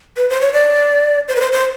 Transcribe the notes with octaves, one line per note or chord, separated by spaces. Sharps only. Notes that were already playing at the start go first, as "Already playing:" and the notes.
B4
C5
C#5
D5
C5
B4
C5
C5